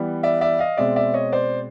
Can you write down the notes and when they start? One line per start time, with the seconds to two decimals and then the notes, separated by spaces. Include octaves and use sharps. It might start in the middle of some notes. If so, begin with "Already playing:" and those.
Already playing: E3 G3 B3
0.23 D5 E5
0.41 D5 E5
0.59 D#5 F5
0.77 B2 G#3 C4 D5 E5
0.96 D5 E5
1.14 C#5 D#5
1.32 C5 D5